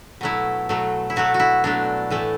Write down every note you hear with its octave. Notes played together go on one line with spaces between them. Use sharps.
B2 F#3 A3 E4
B2 F#3 A3
E4
B2 F#3 A3 F#4
F#4
E4
B2 F#3 A3 D4
A2 E3 A3